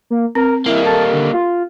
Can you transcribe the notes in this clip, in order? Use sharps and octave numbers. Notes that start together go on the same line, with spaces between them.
A#3
C4 A#4
G3 A#3 E4
G4 A4 A5
D3
F4